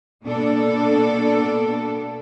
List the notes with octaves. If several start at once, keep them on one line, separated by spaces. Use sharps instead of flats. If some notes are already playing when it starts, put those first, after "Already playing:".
B2 A#3 B3 D4 A4